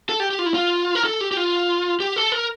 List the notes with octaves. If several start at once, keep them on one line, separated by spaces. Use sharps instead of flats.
A4
G4
G4
F4
E4
F4
A#4
A4
G4
G4
F4
G4
A4
A#4